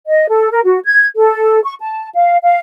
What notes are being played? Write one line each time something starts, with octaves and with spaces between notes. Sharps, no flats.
D#5
A4
A#4
F#4
G#6
A4
C#6
A5
F5
F5